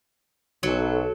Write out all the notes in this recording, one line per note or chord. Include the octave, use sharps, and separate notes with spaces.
B1 F#3 A4